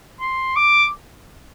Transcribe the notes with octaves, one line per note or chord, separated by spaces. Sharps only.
C6
D6